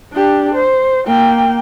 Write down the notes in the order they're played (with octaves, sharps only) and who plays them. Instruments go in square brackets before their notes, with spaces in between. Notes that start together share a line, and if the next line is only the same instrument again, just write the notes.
[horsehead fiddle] D4 G4
C5
A#3 G5